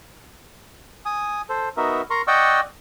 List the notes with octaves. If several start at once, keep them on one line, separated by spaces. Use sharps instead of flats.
G#5 D#6
A4 C5
B3 D#4 F#4 A#4 E5
A#4 A#5 C6 C#6
D5 D#5 F#5 G5 C#6 E6